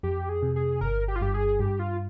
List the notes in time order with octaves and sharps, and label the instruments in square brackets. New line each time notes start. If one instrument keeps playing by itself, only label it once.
[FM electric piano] F2 [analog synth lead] G4
[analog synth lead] G#4
[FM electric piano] C3
[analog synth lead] G#4
[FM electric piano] G1 [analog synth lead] A#4
[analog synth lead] G4
F4
[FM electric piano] G2 [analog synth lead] G4
[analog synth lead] G#4
[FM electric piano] G2 [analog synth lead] G4
[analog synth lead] F4